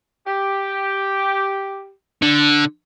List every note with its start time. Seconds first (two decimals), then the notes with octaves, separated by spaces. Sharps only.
0.27 G4
2.22 D3